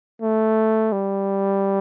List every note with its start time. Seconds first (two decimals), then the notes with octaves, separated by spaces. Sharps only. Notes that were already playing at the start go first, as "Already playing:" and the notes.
0.22 A3
0.92 G3